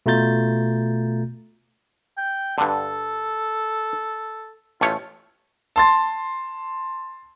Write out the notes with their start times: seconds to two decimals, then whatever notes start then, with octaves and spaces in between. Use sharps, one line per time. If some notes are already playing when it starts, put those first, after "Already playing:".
0.06 B2 A3 F4 A#5 G6 A6
2.18 G5
2.58 G2 D3 A4
4.81 A1 A3 F4 C#5
5.76 A5 C6 A6